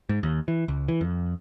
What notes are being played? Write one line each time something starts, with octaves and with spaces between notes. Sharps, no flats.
G#2
D#2
E3
C#2
E3
F2